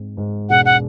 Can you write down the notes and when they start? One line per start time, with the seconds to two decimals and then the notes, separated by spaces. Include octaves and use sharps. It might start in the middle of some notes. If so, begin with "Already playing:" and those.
Already playing: G#2 C4
0.17 G#2
0.50 E1 F#5
0.65 F#5